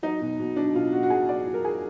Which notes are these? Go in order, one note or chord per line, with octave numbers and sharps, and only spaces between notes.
F#3 D#4
B2
B2
F#3 D4
B2 F4
B2 F#4
F#4
B2 G#4
F#3 D5
F#3
A#4
F#3 G#4